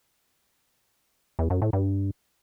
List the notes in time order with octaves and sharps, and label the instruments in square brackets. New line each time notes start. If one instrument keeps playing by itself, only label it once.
[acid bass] E2
F#2
A2
G2